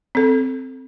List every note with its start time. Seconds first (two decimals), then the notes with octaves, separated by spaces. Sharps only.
0.15 C4 A4